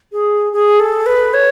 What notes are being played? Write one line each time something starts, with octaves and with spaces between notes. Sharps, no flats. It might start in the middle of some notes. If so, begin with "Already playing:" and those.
G#4
G#4
A4
B4
C#5